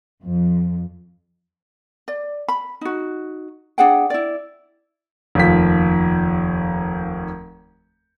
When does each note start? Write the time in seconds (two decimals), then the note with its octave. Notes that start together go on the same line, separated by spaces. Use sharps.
0.23 F2
2.08 D5
2.48 B5
2.81 D#4 F#4
3.78 D4 G#4 F#5 G5
4.10 E4 D5
5.35 F1 D#2 F3 B6